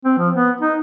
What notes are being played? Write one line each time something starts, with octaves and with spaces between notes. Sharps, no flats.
C4
F3
B3
D#4